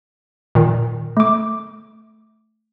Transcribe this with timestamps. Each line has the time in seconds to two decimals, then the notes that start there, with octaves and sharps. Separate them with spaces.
0.55 A#2 D#3
1.17 A3 D6